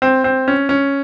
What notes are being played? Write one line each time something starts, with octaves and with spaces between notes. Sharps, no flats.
C4
C4
C#4
C#4